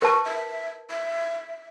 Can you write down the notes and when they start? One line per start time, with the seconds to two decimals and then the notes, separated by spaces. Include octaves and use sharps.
0.02 A#4 B4 A5 C#6
0.25 E5
0.90 E5